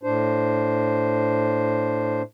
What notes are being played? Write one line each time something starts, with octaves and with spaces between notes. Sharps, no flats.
A2 D4 C5